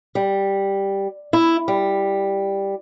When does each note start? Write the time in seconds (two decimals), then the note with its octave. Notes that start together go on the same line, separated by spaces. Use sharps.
0.15 G3
1.33 E4
1.68 G3